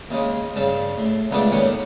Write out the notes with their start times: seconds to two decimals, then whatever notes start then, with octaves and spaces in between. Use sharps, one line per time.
0.11 D#2 C#3 G#3
0.56 G2 C#3 A5
0.98 A2
1.31 C#2 C#3 A3 B3 D4 D5
1.52 D#2 A2 D#3 C#4 F#5